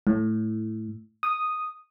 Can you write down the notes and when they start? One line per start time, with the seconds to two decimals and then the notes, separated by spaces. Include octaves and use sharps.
0.07 A2
1.23 D#6